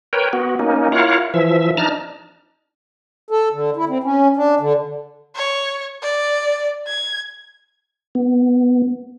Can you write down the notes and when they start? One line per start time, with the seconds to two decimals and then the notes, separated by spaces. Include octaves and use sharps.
0.13 A#4 B4 C#5 G5
0.33 B3 F#4
0.59 A#3 C#4 D#4
0.92 E4 F4 A#4 C#5 F5 F#5
1.34 E3 F3 E5
1.77 D4 D#4 A5 A#5 F6
3.31 A4
3.52 D3
3.76 E4
3.89 C4
4.04 C#4
4.37 D4
4.60 D3
5.36 C#5
6.02 D5
6.87 G#6
8.15 B3